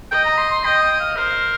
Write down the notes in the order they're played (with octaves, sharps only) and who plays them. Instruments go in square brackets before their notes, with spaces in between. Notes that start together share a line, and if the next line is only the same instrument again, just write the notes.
[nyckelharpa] D#5 [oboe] G5
[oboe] A#5
C6
C6
[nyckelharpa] D#5 [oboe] G5
[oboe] G5
F5
[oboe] A#4 [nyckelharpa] C5